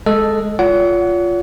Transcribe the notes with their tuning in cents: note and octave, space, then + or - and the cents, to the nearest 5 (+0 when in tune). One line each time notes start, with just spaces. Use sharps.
G#3 +15 A4 +0 D#5 +0
F4 +0 C#5 +45 F#5 +0